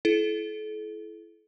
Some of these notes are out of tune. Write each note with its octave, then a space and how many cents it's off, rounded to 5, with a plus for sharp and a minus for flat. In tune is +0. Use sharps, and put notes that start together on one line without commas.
E4 +15 A4 -40